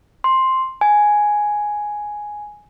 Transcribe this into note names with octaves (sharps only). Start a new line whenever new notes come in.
C6
G#5